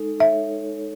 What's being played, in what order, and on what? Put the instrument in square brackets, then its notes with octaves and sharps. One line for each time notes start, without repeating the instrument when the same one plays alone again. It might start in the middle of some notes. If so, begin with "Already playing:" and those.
Already playing: [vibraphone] G#3 D#4 A4
[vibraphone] C#5 [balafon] E5